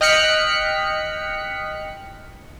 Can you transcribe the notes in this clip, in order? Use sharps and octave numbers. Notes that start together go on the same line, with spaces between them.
D#5 G5 F6 F#6 B6 C#7